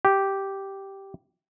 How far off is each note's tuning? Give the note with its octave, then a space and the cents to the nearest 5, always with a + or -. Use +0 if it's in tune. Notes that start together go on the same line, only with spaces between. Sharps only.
G4 -5